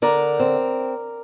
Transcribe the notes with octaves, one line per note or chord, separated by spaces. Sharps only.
D3 A#4 D5
C4